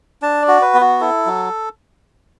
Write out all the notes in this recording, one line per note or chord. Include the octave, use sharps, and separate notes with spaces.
D4 A5
D5
F#4
B4
B3
F#4
E4 A4
F#3